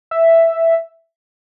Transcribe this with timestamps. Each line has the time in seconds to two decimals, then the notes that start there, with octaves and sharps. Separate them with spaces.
0.11 E5